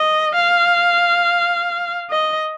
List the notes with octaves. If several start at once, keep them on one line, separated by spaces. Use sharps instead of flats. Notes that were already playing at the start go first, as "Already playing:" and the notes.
Already playing: D#5
F5
D#5